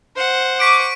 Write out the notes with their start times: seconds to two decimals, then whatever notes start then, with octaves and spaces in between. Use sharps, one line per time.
0.16 C5 F#5
0.60 C#6 D6 B6 D7